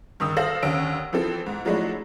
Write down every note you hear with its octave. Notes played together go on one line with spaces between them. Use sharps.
G2 D#3 D#6 E6
A4 C5 F5 A#6 F#7
D#2 D3 C#4 E6 D7
E3 F3 C4 A4
G#2
F3 F#3 G#3 A3 D4 E4